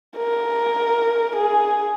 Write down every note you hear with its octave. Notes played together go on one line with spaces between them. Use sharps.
A#4
G#4